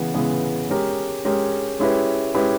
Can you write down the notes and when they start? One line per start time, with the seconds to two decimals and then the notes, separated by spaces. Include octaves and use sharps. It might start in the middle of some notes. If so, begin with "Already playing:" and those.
Already playing: C#3 E3 G#3 B3
0.14 C#3 E3 G#3 B3
0.69 G#3 C#4 G4 A#4
1.25 G#3 C#4 G4 A#4
1.79 G#3 C#4 E4 G4 B4
2.34 G#3 C#4 E4 G4 B4